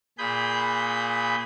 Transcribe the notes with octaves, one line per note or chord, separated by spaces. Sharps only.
A#2 G#4 B5 G6